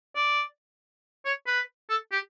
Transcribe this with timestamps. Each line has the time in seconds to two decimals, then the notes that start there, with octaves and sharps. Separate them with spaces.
0.16 D5
1.25 C#5
1.47 B4
1.90 A4
2.12 G4